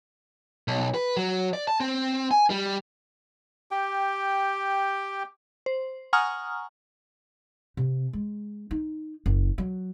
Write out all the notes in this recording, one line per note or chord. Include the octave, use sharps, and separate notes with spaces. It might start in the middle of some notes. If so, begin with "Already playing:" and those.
B1
B4
F#3
D5
A5
C4
G#5
G3
G4 G5
C5
F#5 G#5 A#5 C#6 D#6 F6
C3
G#3
D#4
F#1
F#3